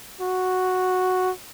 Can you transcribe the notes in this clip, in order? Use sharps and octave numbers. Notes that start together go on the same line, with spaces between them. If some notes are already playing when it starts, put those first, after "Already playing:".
F#4